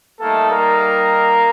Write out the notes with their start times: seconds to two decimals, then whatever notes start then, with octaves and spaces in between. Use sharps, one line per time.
0.20 G3 A3 A#3 D#4 A4
0.50 A#3 A#4